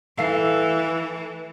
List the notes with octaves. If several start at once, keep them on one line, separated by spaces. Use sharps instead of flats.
E3 A3 F5